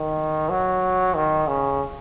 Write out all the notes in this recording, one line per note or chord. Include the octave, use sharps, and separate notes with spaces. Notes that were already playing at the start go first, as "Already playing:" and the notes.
Already playing: D#3
F#3
D#3
C#3